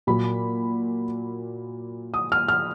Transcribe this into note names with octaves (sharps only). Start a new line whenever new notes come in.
A#2 F#3 A#3 B5
D#6
F6
F6